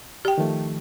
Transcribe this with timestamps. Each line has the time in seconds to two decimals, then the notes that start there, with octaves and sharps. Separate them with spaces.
0.25 G4 G5
0.38 D#3 F3 A3